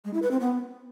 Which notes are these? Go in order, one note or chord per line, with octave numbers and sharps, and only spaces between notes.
G#3
E4
B4
C4
B3